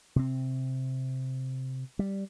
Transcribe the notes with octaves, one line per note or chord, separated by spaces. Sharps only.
C3 C4
G3